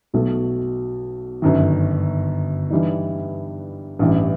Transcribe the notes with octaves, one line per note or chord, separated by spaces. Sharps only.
B1 B2 F#3 A3
G1 F#2 D#3
G2 E3 G3 D#4
A1 G2 E3